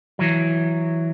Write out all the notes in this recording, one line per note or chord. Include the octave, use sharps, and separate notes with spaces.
E3 F#3